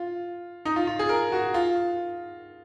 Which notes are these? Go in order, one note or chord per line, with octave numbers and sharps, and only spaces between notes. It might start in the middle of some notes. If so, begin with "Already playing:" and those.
Already playing: F4
D#4
F4
F4
G#4
A#4
F#4
F4